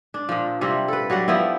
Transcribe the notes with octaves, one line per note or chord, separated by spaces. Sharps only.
D4
A#2 F3
C3 F3 G3 E4
A4 B4
F#3 G3 D5 F#5
F3 B3 C4 E4